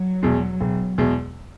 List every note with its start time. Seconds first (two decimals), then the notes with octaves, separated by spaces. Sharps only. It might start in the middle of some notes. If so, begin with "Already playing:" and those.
Already playing: F#3
0.23 E2 B2 G#3
0.61 E1
0.98 E2 B2 G#3